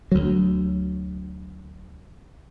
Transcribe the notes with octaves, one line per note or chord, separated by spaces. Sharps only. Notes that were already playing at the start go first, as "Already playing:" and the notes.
D2 F#3